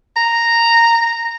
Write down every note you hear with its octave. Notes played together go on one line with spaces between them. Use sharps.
A#5